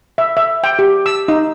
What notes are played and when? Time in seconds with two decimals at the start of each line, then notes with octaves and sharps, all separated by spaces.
0.18 E5
0.37 E5
0.64 G5
0.79 G4
1.06 E6
1.28 D#4